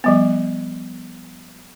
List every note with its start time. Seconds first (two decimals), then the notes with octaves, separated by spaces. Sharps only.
0.04 F3 G3 B3